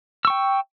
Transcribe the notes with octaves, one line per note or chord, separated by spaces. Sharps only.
G5 C#6 E6